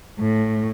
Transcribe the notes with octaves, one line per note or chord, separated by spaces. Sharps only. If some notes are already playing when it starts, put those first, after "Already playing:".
A2